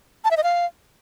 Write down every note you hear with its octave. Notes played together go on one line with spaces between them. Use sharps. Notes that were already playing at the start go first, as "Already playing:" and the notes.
A5
E5
D#5
F5